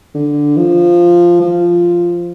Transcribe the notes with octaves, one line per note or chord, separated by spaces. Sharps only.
D3
F3
F3